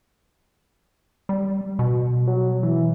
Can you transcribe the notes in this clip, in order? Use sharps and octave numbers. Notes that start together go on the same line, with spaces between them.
G3
B2
F#3
E3